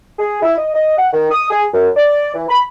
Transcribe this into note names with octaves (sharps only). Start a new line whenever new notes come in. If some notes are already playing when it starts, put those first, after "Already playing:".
G#4
E4
D#5
D#5
F#5
D#3
D#6
G#4
F#2
D5
E3
B5